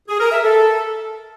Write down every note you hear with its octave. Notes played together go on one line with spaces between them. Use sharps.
G#4
A#4
E5
A4